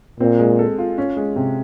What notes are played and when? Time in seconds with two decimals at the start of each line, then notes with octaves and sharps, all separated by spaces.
0.20 A#2 C4
0.39 G#3
0.59 A4
0.79 F4
0.98 C#4
1.17 G#3
1.36 C3